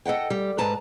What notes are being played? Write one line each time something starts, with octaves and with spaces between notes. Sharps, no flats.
A4 D#5 F#5 G5
G3
G#2 B4 A5 A#5